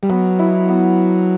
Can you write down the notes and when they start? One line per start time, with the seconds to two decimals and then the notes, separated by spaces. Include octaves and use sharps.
0.03 G3
0.10 F#3 B3
0.39 E4
0.68 B3